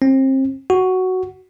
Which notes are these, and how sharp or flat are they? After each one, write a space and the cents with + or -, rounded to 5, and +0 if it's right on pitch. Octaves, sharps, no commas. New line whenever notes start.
C4 +30
F#4 +5